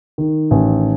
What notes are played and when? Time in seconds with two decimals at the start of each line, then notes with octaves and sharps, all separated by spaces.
0.18 D#3
0.51 A1